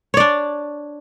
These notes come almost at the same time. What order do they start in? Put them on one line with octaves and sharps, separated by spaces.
C#5 D5 D4